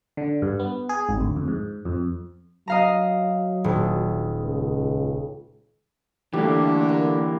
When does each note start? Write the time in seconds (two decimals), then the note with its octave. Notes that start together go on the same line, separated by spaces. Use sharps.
0.17 D3
0.42 G2
0.60 B3
0.89 G#4
1.09 G#1
1.21 D2
1.36 F2
1.48 G#2
1.85 F2
2.68 F#3 D#5 F5 A#5
3.64 D#1
4.40 C#2
6.33 D3 E3 G3 A3 A#3 G4
6.89 A#4